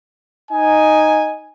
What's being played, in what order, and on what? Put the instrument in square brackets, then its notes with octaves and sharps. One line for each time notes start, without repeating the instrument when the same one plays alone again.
[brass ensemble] D#4 G#5